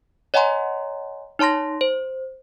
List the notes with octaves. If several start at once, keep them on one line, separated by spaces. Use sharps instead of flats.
C#5 D#5 F#5 G#5 A#5 C6
D#4 C#5 A5 C6 A#6
C5